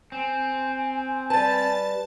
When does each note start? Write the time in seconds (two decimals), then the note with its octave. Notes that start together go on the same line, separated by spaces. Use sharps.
0.12 C4 G#5
1.30 G3 B4 A5 A6